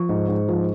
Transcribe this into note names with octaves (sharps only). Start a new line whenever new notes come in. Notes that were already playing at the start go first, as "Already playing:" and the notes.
Already playing: F3 C#6
G#2
G#2
F3